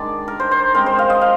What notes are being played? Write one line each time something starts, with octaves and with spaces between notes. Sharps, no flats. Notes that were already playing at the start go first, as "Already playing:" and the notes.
Already playing: D#3 G#3 D4 D5
A#4
C5
C5
D#3 G#3 C4 D#4 A#4
C5
F5
D#5
F5